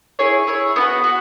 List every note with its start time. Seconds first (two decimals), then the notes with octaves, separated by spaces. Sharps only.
0.19 E4 G#4 C#5
0.47 E4 G#4 C#5
0.76 B3 D#4
0.80 F#4
1.04 F#4